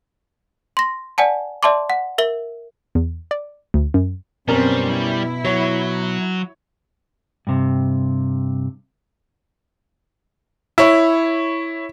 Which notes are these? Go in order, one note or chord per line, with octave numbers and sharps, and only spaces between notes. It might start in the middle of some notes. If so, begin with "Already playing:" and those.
C6 A#6
D5 F#5 G#5 A5
D5 E5 A5 C6 D6
F#5
A#4 E5 G7
E2
D5
D2
F#2
F#2 B2 G3 C4 C#4 A#4 C5
E4
F#3 C#5
G2 C3
E4 C#5